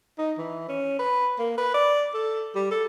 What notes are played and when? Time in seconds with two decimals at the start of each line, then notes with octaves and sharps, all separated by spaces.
0.18 D#4
0.38 E3
0.69 C#4
0.99 B4
1.39 A#3
1.58 B4
1.74 D5
2.14 A4
2.55 G3
2.71 A4